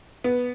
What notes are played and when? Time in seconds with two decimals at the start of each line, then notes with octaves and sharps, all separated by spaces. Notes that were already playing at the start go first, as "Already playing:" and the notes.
0.24 B3